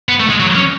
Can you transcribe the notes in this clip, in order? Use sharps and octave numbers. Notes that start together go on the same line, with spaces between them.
B3
A3
G#3
F#3
C#4